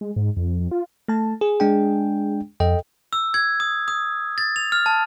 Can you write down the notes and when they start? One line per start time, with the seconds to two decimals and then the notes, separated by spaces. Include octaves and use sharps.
0.01 G#3
0.16 G#2
0.37 F2
0.60 F2
0.71 F4
1.08 A3 A5
1.41 G#4
1.60 G#3 D4 G5
2.60 F2 A4 D#5 G5
3.13 E6
3.34 G#6
3.60 D#6
3.88 D#6
4.38 A6
4.56 F7
4.72 F6
4.86 A5